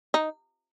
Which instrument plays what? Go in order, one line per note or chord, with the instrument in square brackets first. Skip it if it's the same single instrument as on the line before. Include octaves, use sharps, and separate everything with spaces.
[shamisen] D#4